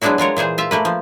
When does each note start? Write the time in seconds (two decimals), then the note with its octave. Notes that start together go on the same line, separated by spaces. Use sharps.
0.02 F#3 G#3 B3 D4 E4 F#4
0.18 G#3 F4 A#4 C#5
0.37 A#2 E3 G#4 C5
0.58 F4 E5
0.71 A3 A#3 B4
0.85 F3